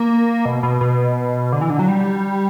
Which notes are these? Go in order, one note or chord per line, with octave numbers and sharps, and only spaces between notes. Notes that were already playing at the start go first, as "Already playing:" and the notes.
Already playing: A#3
B2
B2
B2
D3
E3
D3
F#3
G3